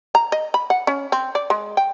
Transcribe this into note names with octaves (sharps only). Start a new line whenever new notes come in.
A#5
D#5
B5
F#5
C#4
C4
D5
G#3
G5